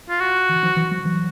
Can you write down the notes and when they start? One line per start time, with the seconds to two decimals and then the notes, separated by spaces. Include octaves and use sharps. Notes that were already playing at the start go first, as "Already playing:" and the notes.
0.09 F4
0.20 F#4
0.49 D3 E3
0.63 D#3 F3
0.77 E3 F#3
0.91 F3 G3
1.05 E3 F#3